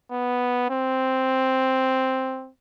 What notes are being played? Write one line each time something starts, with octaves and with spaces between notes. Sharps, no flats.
B3
C4